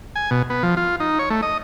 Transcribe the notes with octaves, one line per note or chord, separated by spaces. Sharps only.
G#5
B2
B3
F3
F4
D#4
C#5
A3
D#5